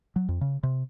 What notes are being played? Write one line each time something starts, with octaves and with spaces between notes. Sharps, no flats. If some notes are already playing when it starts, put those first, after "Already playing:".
F#3
F2
C#3
C3